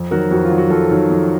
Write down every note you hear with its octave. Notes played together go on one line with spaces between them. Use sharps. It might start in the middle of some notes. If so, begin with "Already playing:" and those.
Already playing: F2
D#3 F#3 F#4 A#4
F2 F#4
F4
D#3 F#3
F#4
F2 F4 A4
D#3 F#3
F2